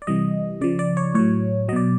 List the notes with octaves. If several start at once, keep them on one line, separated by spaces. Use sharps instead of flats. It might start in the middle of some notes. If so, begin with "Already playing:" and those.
D5
C3 E3 G3 D#5
C#3 F3 D5
D5
C#5
A2 F#3 C#5
B2 F#3 D5 D#5